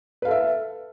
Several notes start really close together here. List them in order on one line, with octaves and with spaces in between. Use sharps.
B4 F5 A4 E5